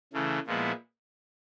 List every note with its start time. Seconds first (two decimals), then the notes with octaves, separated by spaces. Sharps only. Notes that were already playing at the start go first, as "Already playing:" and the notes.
0.13 C#3 E3 A3
0.46 A#2 F3 G#3 B3 E4